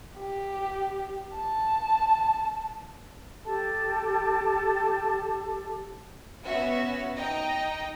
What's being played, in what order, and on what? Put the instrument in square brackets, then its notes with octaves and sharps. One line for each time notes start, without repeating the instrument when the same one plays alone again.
[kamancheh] G4
A5
[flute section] G4 A4 A5
[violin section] B3 C#4 F#4 E5
D#4 D#5 G5 A#5